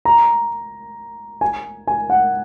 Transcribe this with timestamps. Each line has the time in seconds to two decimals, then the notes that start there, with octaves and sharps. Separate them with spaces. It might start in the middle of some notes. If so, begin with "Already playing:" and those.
0.05 A#5
1.41 G#5
1.87 G#5
2.10 F#5